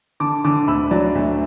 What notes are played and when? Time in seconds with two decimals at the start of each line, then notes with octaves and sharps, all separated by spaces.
0.20 D3 A5 D6
0.44 D3 A5 D6
0.67 D2 B5 E6
0.91 F#3 D5
1.15 D2 E5